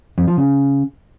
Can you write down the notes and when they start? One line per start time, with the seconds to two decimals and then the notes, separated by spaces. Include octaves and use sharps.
0.18 F2
0.28 F3
0.37 C#3